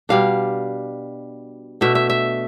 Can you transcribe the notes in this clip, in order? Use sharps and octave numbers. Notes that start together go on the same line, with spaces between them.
B2 G3 D4 F5
B2 A3 D4 E5
E5
E5